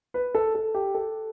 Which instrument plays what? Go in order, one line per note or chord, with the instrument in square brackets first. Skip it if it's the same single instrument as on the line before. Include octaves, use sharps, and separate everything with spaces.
[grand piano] B4
A4
A4
G4
A4